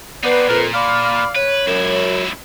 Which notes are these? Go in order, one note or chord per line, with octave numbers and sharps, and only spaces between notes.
B3 C4 D#4 B4 D5
F2 A#2 A#4
D5 F5 B5
B4 C#5
C#2 F#2 E4